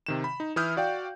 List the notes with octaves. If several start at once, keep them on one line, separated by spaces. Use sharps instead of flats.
C3 D#3 E7
B5
D#4
E3 E4 D#6 F6 G6
F#4 D5 F5 G5